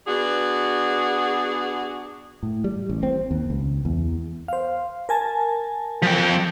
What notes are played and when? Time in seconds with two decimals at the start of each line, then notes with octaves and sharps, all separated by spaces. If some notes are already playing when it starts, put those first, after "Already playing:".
0.07 B3 D4 F#4 G#4
2.43 A2
2.64 G3
2.89 A1
3.03 C4
3.31 D#2
3.50 C#2
3.85 E2
4.48 C5 F5
5.09 A#4 G#5 A5
6.02 F3 G5